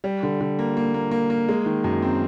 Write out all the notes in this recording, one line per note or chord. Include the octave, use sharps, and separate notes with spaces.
G3
D3
D3
A#3
A#3
A#3
A#3
A#3
G#3
D#3
F#2
C4